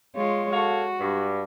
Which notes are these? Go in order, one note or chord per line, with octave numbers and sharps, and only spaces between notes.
G#3 F4 C#5
F#4 A4 C#5 F5
G2